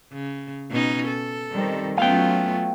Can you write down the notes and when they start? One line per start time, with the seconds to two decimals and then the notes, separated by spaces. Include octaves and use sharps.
0.13 C#3
0.70 B2 C#4 D#4
1.08 A4
1.51 D#3 G3 C4
1.97 F#3 A3 B3 C#4 F4 F5 G5